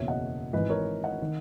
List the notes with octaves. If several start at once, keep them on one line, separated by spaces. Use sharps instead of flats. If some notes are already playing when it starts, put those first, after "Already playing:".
Already playing: F#1 E2 B2 C#5 E5
D#5 F#5
G#1 G#2 E3 B4 D#5
A#4 C#5
D#5 F#5
D#3